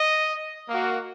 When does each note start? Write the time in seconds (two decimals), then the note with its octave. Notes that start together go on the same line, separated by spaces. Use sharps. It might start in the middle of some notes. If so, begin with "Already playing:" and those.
Already playing: D#5
0.69 A#3 F#4